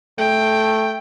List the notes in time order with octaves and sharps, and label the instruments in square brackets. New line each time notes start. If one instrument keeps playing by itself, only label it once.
[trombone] A3 [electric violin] G5